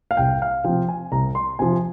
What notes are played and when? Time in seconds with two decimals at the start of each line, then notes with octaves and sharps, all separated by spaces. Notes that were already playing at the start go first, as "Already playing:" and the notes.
0.11 F5
0.17 C2 G5
0.42 F5
0.65 C3 F3 G5
0.88 G#5
1.12 C2 A#5
1.35 C6
1.59 C3 F3 G#5